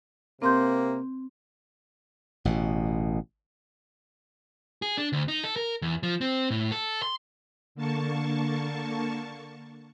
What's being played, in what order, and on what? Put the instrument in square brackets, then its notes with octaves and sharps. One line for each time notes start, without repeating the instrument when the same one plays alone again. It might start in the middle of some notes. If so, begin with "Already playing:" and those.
[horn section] C3 A#3 [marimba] C4 C6 G6
[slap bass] A1 B2
[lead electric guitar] G#4
D4
D2
D#4
A4
A#4
E2
F3
C4
A2
A4
C6
[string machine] D3 A#3 A5 C#6